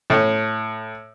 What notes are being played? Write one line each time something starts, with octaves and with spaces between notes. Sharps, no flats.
A2